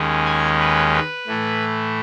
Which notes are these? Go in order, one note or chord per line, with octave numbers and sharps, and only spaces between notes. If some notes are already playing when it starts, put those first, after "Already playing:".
Already playing: D#2 D#3 G#3 C#4
G#5
B4
B4
A2 E3 A3